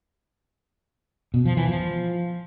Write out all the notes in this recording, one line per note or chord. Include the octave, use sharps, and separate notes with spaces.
B2
F3
E3
F3